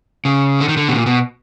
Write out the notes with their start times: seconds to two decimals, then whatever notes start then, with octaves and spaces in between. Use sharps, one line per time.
0.25 C#3
0.60 D3
0.68 D#3
0.77 D3
0.89 B2
0.95 A#2
1.06 B2